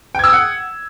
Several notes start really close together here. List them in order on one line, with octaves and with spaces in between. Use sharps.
G5 G#6 E6 D#6 F#5